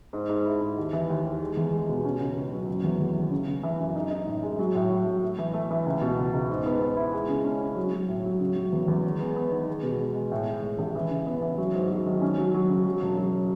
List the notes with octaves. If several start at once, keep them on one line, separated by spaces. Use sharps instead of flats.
G#2
G#2
E4
G#2
D#2
E3
D#2
D#2
G#3
E2
G#3
B2
C#4
C#2
C#2
F#3
F#1
E2
E2
A3
C#3
C#3
E3
F#2
D#4
D#4
A2
G#3
F#3
A2
A2
F#3
A3
E3
A3
E3
C#2
B2
C#2
C#2
G#2
B3
B3
E4
G#3
C#3
C#4
C#4
F#3
F#3
A2
F#3
C#3
F#3
E2
E2
G#3
B3
B3
D#3
G#3
B2
G#3
G#3
A2
G#3
A2
A1
E3
C#3
B3
E3
F#3
G#2
F#3
D#3
C#4
F#3
F#3
C#3
F#3
E1
F#3